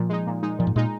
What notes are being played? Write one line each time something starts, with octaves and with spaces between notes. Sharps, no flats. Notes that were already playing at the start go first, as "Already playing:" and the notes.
Already playing: A#2 F3
G#3 D#4
A#2
G#3 D#4
A#2 F3
G#2
A#2 G#3 D#4